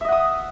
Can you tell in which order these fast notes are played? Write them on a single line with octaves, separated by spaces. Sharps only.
E5 D#5 F#5 D#6